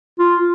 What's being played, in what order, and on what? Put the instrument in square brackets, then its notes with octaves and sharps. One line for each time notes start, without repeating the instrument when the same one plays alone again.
[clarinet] F4